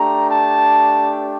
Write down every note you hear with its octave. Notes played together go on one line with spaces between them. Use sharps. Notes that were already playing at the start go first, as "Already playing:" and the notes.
Already playing: A3 D4 G4 A#5
A5